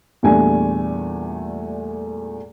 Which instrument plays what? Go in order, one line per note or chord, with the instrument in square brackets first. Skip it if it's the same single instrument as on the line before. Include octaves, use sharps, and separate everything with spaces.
[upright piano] E2 A#2 G3 A3 D4 G#5